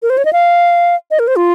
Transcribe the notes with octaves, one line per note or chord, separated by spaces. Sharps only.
A#4
C5
C#5
D#5
F5
D#5
A#4
C5
F4